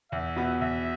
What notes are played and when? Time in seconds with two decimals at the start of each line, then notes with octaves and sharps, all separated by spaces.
0.12 E2 E5
0.36 B2 B3
0.61 E2 E5